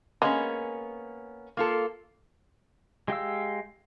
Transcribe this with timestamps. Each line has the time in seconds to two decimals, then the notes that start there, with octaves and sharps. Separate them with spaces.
0.22 G#3 A#3 B3 C#4
1.57 A#3 F4 A4
3.08 G#3 G4 F5 E6